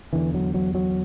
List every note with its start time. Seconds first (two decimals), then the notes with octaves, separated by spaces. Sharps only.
0.13 E2 D3 E3
0.34 F#3
0.54 F#3
0.75 F#3